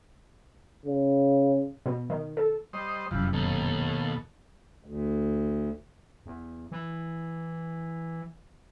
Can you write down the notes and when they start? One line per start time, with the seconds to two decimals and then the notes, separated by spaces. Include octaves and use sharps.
0.85 C#3
1.86 B2
2.10 D#3
2.37 A4
2.73 G3 C5 D#5
3.11 F1 F#2 E3 F3 G3
3.33 D#2 B2 A4
4.84 D2
6.26 E2
6.71 E3